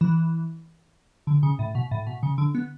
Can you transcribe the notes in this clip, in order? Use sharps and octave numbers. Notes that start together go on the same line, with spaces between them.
E3
D3
C#3
A2
B2
A2
B2
C#3
D3
B3